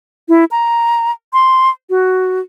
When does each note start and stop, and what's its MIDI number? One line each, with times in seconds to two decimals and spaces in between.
0.29 0.45 64
0.51 1.11 82
1.33 1.69 84
1.90 2.40 66